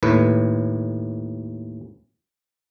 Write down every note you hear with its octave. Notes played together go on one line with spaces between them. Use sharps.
D#2 A2 B4